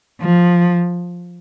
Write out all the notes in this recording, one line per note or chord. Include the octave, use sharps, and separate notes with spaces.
F3